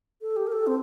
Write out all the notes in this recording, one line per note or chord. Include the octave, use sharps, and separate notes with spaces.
A4
G4
A#4
A4
C4